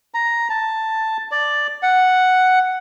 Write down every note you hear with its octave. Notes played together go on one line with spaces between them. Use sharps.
A#5
A5
D5
F#5